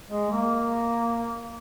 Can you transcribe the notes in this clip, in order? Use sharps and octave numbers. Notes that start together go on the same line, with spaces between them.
G#3
A#3